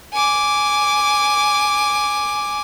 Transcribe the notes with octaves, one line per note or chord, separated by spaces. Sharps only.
G#5 D6